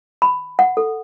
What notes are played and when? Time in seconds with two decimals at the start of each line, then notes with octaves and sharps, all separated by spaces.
0.22 B5
0.59 F#5
0.77 A4